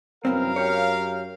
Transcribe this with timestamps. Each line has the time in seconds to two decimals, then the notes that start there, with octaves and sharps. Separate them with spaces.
0.25 C2 F#2 B3 C4 A#4 F5
0.56 G4 C#5